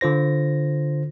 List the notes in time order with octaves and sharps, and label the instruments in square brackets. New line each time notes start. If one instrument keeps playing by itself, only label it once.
[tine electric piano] D3 F4 C5 A#6